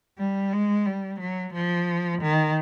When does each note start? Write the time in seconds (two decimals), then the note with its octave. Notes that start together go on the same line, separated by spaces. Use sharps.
0.18 G3
0.52 G#3
0.86 G3
1.19 F#3
1.53 F3
2.22 D#3